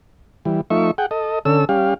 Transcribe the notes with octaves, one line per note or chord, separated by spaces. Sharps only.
E3 G3
F3 A3 D#4 E5 C#6
G#4 F#5 G5
A4 D#5
D3 C#4 A4 E6
G3 C#4 G4 F5